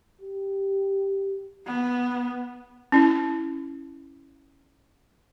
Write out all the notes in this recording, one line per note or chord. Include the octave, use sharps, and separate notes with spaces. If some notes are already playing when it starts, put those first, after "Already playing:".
G4
B3
C#4 E4